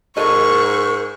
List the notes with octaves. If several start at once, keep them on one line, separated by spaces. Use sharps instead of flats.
G#2 A4 A#4 D#5 C#6